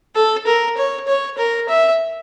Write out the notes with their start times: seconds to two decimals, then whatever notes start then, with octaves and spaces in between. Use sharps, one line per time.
0.15 A4
0.47 A#4
0.77 C#5
1.08 C#5
1.38 A#4
1.69 E5